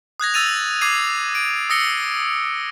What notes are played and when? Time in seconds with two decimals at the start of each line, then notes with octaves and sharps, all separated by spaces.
0.20 D#6 F#6 G#6 A#6
0.34 E6 A6 D#7 F7
0.81 D6 G#6 C7 D#7
1.35 D7
1.70 D#6 E6 A#6 C#7 G7